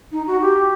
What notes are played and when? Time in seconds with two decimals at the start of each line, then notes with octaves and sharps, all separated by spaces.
0.12 D#4
0.27 F#4
0.41 G4